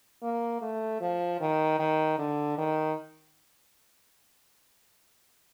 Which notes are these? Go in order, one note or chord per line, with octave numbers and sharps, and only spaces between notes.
A#3
A3
F3
D#3
D#3
D3
D#3